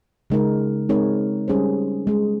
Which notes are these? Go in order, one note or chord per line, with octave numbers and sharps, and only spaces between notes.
C#3 G#3 D#4 A#4
G#3 C4 D#4 A#4 C#5
G3 C#4 G#4 C5
G#3 C#4 G#4